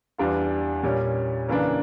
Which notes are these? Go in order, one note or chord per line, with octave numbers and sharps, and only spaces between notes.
E2 E3 G3 D4 F4
A#2 G3 C#4
C#3 E3 A#3 D4